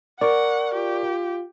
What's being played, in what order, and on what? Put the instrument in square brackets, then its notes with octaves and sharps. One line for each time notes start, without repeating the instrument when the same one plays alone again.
[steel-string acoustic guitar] A#4 [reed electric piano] D5 C#6 [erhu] F#5
[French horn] F4 [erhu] G4